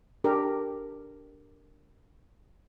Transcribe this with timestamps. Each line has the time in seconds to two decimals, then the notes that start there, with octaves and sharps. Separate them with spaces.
0.24 D4 G4 A#4